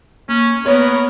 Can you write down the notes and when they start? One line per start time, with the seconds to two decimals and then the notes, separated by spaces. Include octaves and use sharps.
0.29 A#3 C#4
0.66 B3 A#4 C#5